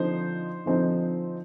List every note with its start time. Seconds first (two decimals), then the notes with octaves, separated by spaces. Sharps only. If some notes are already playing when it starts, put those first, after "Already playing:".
Already playing: D3 F3 C4 D#4 C5
0.66 D3 F3 C4 D#4